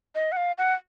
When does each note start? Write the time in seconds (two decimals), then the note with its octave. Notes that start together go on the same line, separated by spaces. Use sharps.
0.15 D#5
0.32 F#5
0.37 F5
0.58 F#5